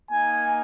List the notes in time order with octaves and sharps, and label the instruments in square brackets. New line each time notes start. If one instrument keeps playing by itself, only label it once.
[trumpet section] A#3 D#4 G#5